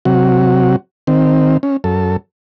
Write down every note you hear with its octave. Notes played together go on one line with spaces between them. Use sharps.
C3 F#3 F#4
D#3 C4
C#4
F#2 A4